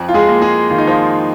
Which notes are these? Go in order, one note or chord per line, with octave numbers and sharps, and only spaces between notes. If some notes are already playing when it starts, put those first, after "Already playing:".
Already playing: F2
F4
G#3 G#4
A#3
G#3 G#4
D#3 F4
D#4
F3 F4